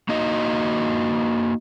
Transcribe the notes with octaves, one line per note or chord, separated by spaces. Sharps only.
A#3 D#4 F#4 D#5